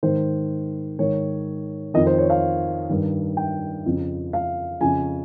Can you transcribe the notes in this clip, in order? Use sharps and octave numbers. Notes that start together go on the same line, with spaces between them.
G#2 D#3 C5
G#2 D#3 C#5
F2 D#3 D#5
C5
C#5
F5
G2 D#3
G5
F2 C#3
F5
F2 C#3 G#5